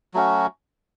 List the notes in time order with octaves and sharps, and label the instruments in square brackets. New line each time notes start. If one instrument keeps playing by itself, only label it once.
[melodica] F#3 A3 C#4 F#4